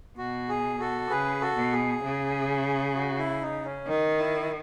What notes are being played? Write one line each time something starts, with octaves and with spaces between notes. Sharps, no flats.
B2 F#4
G#4
F#4 A4
C#3 G#4 B4
F#4 A4
B2
G#4
C#3
F#4
E4
D#4
C#4
D#3 D#4
E4